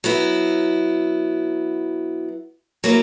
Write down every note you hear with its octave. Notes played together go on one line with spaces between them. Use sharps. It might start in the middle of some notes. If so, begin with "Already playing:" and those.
F#3 B3 E4
F#3 A#3 E4